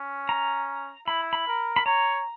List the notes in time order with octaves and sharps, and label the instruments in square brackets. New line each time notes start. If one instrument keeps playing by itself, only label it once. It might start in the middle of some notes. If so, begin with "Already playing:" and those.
Already playing: [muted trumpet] C#4
[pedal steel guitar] A#5
[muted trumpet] E4 [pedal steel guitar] B5
[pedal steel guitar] B5
[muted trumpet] A#4
[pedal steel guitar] B5
[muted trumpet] C#5 [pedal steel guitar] A#5